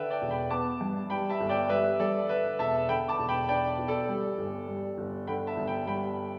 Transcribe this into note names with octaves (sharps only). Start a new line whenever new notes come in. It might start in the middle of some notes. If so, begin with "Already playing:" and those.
Already playing: D3 B4 D5 E5 G5 A5
D5 G5
E1
G5 B5
B3 A5 D6
G2
G3 G5 B5
E5 A5
G1
D5 G5
G3 B4 E5
G2 A4 D5
D3 B4 E5
E1 E5 A5
D3 G5 B5
A5 D6
E1
G5 B5
D4 D5 G5
B2
A4 D5
G3
G1
G3
G1
D3 G5 B5
E5 A5
G1
G5 B5
G3 G5 B5